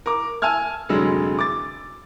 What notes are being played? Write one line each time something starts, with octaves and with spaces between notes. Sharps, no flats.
A#4 D6
G#5 A5 E6 F6 G#6
F1 D3 F#3 G#3 E6
D6 A6